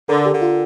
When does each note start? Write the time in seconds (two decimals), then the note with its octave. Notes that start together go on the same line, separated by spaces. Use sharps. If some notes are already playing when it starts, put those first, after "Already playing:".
0.09 D3 A#4
0.25 G4
0.33 D3
0.42 F4